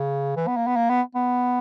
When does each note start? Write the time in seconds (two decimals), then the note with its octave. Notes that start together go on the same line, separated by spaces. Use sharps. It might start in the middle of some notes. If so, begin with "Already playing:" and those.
Already playing: C#3
0.37 E3
0.47 B3
0.57 A#3
0.67 B3
0.76 A#3
0.90 B3
1.15 B3